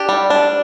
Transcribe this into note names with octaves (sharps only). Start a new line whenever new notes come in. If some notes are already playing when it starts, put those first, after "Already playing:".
Already playing: D4 G4
G3
D4